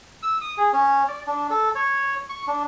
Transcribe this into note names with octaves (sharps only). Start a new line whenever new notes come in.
E6
D#6
G#4
C#4
D5
D4
A4
C#5
C#6
D4